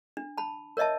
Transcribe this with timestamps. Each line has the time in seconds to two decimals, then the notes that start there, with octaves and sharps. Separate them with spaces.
0.17 D4
0.38 A5 B5
0.77 A#4 C#5 D#5 E5 A5